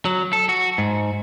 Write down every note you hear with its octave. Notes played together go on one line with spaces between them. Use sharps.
F#3
A4
F#4
G#2